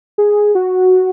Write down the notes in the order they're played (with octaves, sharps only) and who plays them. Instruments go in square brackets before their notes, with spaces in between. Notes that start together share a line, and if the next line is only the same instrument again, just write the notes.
[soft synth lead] G#4
F#4